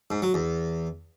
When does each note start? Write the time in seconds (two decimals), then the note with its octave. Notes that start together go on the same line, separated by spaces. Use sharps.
0.11 G#2
0.22 F#3
0.34 E2